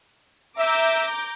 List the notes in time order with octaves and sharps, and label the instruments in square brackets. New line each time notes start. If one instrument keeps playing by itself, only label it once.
[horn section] E5 [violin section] A#5 D6 G6